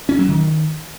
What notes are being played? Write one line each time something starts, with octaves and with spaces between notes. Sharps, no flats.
C#4
F#3
D#3